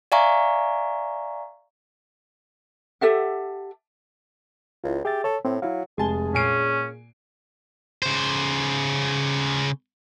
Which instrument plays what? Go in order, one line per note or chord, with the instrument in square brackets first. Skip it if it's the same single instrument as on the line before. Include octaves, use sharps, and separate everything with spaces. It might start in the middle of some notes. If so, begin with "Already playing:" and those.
[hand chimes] D5 E5 F5 G#5 A#5 C#6
[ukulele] G4 A4 E5 F#5
[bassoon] C#2 [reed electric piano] E4 F4
[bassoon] G4 [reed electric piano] G#4 E5 A6
[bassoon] A4 [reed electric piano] C#5
[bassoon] A2 [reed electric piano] C4
[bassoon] F#3 [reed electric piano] E4 F5
[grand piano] F1 G#5 G7 [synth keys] G#3 A5 [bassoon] G#4
[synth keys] A#2 [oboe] C#4 [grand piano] G#5 C7 D7
[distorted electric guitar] C#3 C5